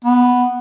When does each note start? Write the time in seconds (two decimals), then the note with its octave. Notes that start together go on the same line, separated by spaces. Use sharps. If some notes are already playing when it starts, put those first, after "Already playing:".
0.05 B3